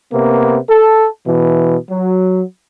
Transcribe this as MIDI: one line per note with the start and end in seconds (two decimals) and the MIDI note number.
0.12 0.57 48
0.12 0.57 58
0.12 0.57 59
0.69 1.07 69
1.27 1.76 47
1.27 1.76 52
1.90 2.42 54